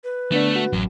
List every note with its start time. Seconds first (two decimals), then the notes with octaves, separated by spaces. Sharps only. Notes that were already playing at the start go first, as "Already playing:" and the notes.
0.04 B4
0.32 D3 A3 B3 D4
0.56 F#4
0.73 A1 F#2 F#3